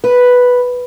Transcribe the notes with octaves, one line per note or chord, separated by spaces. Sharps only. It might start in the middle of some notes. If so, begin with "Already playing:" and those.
B4